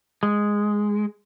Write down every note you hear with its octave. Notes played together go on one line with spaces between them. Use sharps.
G#3